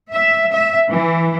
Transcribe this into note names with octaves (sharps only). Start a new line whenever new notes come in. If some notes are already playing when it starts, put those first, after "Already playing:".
E5
E5
E3